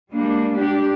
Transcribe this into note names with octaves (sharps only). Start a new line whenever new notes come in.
G3 G#3 A#3 D4
D4 G4